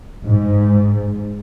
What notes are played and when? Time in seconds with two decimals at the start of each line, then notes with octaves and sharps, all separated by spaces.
0.24 G#2